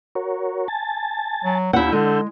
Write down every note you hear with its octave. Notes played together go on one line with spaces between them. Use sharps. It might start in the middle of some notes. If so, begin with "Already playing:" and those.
F#4 A#4 C#5
G#5 A5 A6
F#3
D#2 D4 E4 F#5 E6 G6
D3 G#3